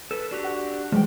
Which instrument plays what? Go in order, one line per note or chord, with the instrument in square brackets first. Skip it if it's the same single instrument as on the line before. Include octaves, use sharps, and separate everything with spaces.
[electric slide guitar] A4 B4
D4 F#4 G4
[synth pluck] F#5
F#6
[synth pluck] E3 G3 G#3 [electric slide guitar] F3 G5